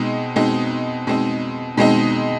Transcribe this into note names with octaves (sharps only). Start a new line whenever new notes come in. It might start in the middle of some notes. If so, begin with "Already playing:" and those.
Already playing: B2 G#3 C4 D#4
B2 G#3 C4 D#4
B2 G#3 C4 D#4
B2 G#3 C4 D#4